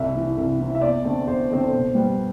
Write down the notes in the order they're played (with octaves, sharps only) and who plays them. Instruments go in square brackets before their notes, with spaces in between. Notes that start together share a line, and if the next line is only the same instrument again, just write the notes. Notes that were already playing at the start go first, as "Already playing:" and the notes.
Already playing: [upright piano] C2 E5
C3 E3
C2
C3 E3
E5
E2 D5
D3 A3 C4
E2 C5
D3 A3 C4
B2
G3 B3